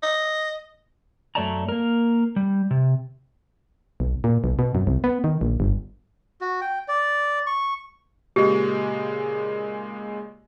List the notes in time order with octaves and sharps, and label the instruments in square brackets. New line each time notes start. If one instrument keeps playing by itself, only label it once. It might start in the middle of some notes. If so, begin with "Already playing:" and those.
[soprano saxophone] D#5
[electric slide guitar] F#2 A3 C#5 D5 A5 A#5
A#3 A#4
G3
C3
[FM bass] B1
A#2
B1
B2
F#2
C2
B3
D#3
A#1
G1
[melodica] F#4
G5
D5
C#6
[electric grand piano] A#2 C#3 G#3 [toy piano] G4